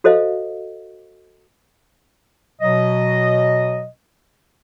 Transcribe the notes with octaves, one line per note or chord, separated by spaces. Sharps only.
F#4 A4 C5 D#5 F5
B2 F#3 D#5